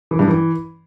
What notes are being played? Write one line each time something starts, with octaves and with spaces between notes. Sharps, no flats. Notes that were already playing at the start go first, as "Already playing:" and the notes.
E3
G2
E3